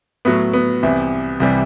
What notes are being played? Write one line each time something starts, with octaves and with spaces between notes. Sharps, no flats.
A2 F#3 B3
B3
C2 C3 E3
C2 C3 E3 G3